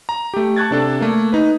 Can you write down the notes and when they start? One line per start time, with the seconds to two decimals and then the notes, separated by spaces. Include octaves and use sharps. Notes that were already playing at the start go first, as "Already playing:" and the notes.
0.09 A#5
0.34 A3 G4
0.56 A5 C#6 F#6 G#6 A6
0.71 C3 D4 A4
1.01 A3 A#3
1.33 D#4 B4